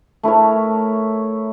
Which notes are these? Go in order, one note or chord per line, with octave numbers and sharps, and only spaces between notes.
A3 E4 A#4 C#5